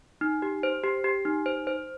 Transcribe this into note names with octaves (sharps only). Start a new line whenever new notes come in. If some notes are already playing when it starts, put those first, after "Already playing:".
D#4
G4
C5
G4
G4
D#4
C5
C5